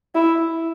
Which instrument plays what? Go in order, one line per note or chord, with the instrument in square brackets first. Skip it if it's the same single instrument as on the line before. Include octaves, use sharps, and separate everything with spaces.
[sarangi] E4